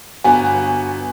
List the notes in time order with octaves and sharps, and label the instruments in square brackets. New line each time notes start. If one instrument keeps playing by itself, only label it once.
[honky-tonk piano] G1 B3 F#4 [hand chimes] G#5